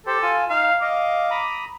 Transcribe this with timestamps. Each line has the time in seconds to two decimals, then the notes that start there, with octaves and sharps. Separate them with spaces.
0.07 G4 A4 C5
0.23 F4 G#5
0.50 D#4 F5
0.82 D#5 F5 D6
1.31 A#5 B5 D#6